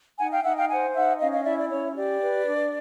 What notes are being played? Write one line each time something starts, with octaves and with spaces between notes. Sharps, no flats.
D#4 F#5 G#5
F5 G5
D#4 E5 F#5
F5 G5
C5 F#5 G#5
D#4 E5 F#5
C#4 D#5 F5
D#5 F5
E4 D5 E5
D5
C#4 C#5
G4 D5
B4
D4